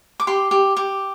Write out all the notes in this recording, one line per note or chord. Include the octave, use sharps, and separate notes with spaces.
D6
G4 C6
G4
G4